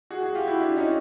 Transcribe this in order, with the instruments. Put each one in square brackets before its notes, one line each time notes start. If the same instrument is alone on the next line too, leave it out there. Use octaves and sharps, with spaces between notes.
[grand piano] F#4 G#4
F#4 G#4
F4 G4
E4 F#4
D4 E4
C#4 D#4